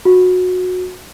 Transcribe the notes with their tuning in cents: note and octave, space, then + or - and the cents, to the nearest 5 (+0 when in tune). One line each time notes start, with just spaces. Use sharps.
F#4 -20